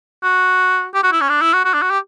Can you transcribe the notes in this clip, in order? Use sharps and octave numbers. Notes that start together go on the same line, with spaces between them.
F#4
G4
F#4
E4
C#4
D4
E4
F#4
F#4
D4
F#4
G4